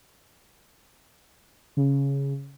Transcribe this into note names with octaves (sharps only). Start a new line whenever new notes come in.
C#3